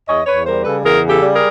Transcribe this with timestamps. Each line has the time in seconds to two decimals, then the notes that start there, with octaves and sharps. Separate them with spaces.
0.07 E2 C#5 D#5
0.26 E2 B4 C#5
0.45 G3 A#4 C5
0.64 C#3 A4 B4
0.83 E2 G#4 A#4
1.02 C#3
1.09 G4 A4
1.21 G3
1.34 G#4 A#4